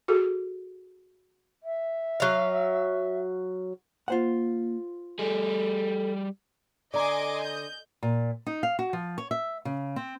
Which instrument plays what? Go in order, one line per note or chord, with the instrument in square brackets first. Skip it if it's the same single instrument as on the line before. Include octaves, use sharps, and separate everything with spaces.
[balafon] F#4 G#4 A4
[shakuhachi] E5
[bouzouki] F#3 F5
[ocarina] A#3 [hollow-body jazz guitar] F4 C5 F#5
[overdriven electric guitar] G3 G#4 [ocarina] A4
[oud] D3 [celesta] D5 A#5 [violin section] D#5 [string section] G#5 C6 D6
[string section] G6
[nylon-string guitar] A#2
D#4
F5
F#4
F3
C#5
E5
C#3
C4